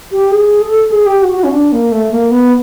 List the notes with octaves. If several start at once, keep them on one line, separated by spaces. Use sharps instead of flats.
G4
G#4
A4
G#4
G4
F#4
F#4
C#4
D4
A#3
A3
A#3
B3